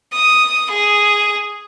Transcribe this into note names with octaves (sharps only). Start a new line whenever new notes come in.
D#6
G#4